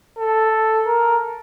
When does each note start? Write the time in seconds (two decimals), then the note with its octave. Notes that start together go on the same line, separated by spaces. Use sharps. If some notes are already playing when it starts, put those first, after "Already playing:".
0.19 A4
0.86 A#4